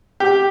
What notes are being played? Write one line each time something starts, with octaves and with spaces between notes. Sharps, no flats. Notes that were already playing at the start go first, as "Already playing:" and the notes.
G4